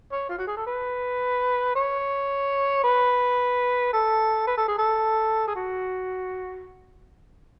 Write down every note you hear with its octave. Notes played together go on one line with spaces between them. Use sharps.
C#5
F4
F#4
G#4
A4
B4
C#5
B4
A4
B4
A4
G#4
A4
G#4
F#4